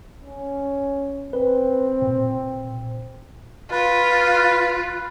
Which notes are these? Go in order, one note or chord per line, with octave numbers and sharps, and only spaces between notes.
C#4
C4 B4
A#2
F4 B4